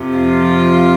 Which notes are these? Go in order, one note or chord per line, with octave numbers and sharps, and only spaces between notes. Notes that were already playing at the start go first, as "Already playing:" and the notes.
Already playing: F2 C3 F3
F4